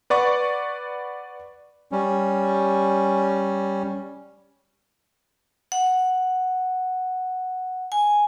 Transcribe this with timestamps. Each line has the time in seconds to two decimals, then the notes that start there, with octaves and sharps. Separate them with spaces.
0.10 B4 D5 F#5 C#6
1.92 G3 C#4
5.72 F#5
7.92 G#5